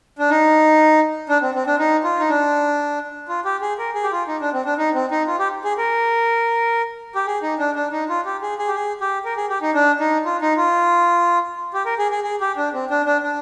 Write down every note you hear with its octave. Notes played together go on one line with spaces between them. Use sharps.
D4
D#4
D4
C4
C4
D4
D#4
F4
D#4
D4
F4
G4
G#4
A#4
G#4
G4
F4
D#4
D4
C4
D4
D#4
C4
D#4
F4
G4
G#4
A#4
G4
G#4
D#4
D4
D4
D#4
F4
G4
G#4
G#4
G4
G#4
G4
A#4
G#4
G4
D#4
D4
D#4
F4
D#4
F4
G4
A#4
G#4
G#4
G#4
G4
D4
C4
D4
D4
D4